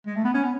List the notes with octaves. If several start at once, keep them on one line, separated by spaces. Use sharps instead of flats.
G#3
A3
B3
C#4
B3